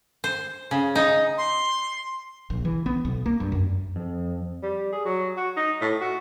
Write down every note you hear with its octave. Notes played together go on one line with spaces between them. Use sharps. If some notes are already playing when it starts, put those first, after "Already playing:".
C5
C#3
D#4
C6
A#1
E3
B3
B1
A#3
G2
F#2
F2
G3
G#4
F#3
F#4
D#4
A2
F#4